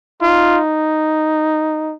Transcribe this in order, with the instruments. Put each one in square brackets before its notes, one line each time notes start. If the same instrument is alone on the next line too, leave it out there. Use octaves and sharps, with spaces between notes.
[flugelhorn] D#4 [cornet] F4